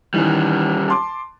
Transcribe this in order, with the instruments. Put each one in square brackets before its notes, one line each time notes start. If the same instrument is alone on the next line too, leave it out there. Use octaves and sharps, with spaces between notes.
[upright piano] D#3 E3 [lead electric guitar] G3 C#4
[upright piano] A5 C6 D6